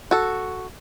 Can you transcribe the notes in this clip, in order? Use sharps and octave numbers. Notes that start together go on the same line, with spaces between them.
F#4 A4